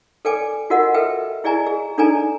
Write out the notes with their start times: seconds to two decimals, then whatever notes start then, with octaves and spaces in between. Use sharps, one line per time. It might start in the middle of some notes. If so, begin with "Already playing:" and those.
0.25 A4 B4 D5 G5 G#5 D6
0.70 F4 F#4 A#4 D#5 F#5
0.94 A4 B4 E5 G5
1.44 E4 G#4 D5 D#5 G#5 A#5
1.67 G#4
1.98 D4 D#4 A4 D5 G#5 A#5